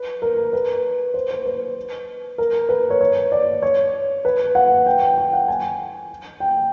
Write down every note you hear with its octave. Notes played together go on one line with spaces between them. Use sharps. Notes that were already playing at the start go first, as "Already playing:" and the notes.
Already playing: B4
A#4
B4
C5
B4
B4
A#4
B4
C#5
C#5
D5
C#5
B4
F#5
G5
G5
G5
F#5
G#5
G5